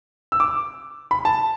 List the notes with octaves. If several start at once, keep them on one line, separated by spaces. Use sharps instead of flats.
E6
D6
B5
A5